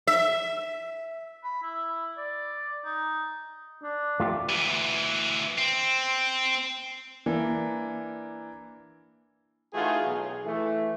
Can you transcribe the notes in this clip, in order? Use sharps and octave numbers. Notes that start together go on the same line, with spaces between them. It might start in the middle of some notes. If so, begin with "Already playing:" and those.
E5
B5
E4
D5
D#4
D4
A3 F4 G4
D2 E3
C4
E3 A#3 D4 D5
E3 A3 D#4 F4 F#4 G#4
B1 B2 G#4
E3 A3